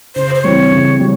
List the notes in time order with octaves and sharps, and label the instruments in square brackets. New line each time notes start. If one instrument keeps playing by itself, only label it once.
[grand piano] C#3 [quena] C5
[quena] C5
[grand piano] E3 G3 C4 [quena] C#5
[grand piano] C#3
G3 C4